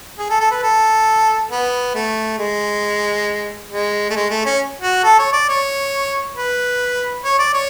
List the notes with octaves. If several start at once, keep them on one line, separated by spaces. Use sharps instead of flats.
G#4
A4
A4
B4
A4
B3
A3
G#3
G#3
A3
G#3
A3
C#4
F#4
A4
C#5
D5
C#5
B4
C#5
D5
C#5